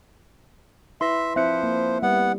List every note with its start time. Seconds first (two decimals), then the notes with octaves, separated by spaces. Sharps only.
1.01 E4 B4 E5 C6 A#6
1.36 F3 C4 E4 C5 E5 F#6 C#7
1.63 A#3
2.03 G3 B3 F#5